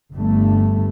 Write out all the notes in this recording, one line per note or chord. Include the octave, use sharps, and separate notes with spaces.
G1 G2 A3